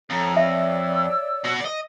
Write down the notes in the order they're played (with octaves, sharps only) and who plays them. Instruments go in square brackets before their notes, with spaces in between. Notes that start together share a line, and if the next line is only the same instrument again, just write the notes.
[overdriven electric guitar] F2 [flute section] A4 C#5 A#5
[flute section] C#5 D5 E6 [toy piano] E5
[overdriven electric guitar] B2 F#4
D5 D#5